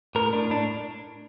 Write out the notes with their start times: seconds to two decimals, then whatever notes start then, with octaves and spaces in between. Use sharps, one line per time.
0.15 A2 A#4
0.33 A2 D4
0.50 A2 D4